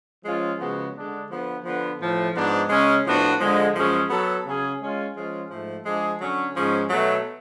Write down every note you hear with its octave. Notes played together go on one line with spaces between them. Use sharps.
F3 G#3 C#4 F4
C#3 F3 G#3 B3 F#4
D3 G#3 D4
D3 F3 B3
D3 F3 B3
A2 F3 A3
G#2 F3 G#3 B3 D4
C#3 G#3 C#4
A2 F3 B3 D4 F#4
D3 F3 G#3
F#2 F3 G#3 C#4 G#4
F#3 B3 F#4 A4
C#3 F#3 C#4 G#4
G#3 C#4 F4
F3 G#3 C#4 F4
G#2 F3 A3
F3 G#3 D4 G#4
D3 F#3 C#4
G#2 F3 G#3 C#4
B2 F#3 A3